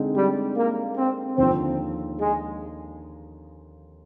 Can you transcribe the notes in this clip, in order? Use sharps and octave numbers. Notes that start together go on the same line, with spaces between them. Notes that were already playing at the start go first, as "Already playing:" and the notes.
Already playing: D3 G#3 C4 D#4
G3
A#3
C4
D#2 D3 F3 C4
G#3